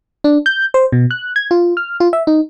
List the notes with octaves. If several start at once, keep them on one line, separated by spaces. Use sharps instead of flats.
D4
G6
C5
B2
F#6
G#6
F4
F6
F4
E5
D#4